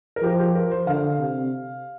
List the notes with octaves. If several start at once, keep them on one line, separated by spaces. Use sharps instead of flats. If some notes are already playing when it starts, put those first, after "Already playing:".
A#4
F3 G4
G4
A#4
C5
D3 F5
C3